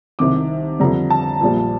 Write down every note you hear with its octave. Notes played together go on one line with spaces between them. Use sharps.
C2 C3 D#3 D6
F2 D3 G3 A#5
A5
A#1 A#2 G3